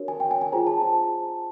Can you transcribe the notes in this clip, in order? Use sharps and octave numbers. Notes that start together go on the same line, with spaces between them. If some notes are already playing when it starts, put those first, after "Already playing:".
Already playing: D4 F#4 A#4 C#5
G#5
G5
G#5
G#5
F4 G#4 C5 A#5
A5
A5